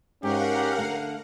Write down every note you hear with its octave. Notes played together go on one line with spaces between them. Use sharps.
G#2 C#4 D#4 G4 A#4 F5 F#5
D3 A3